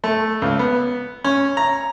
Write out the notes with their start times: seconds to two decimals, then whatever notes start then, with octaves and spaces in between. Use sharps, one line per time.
0.04 A3
0.42 C#2
0.59 B3
1.24 C#4
1.57 A#5